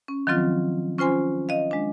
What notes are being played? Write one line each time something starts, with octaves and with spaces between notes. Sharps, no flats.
C#4
D#3 F3 F#3 C4 F4
C#4 F4 C5 G#5 C6
D#5 F5
G#3 D4